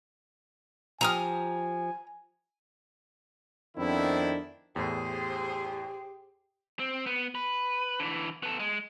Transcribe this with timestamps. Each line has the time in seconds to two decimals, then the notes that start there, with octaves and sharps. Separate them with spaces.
1.01 F3 G4 G#5 A#5 D#6 F6
3.77 F2 D#3 B3 C4 D4 E4
4.76 E2 A2 G4 G#4 C5
6.80 C4
7.06 B3
7.35 B4
8.00 D3 E3
8.43 B3 A4
8.60 G#3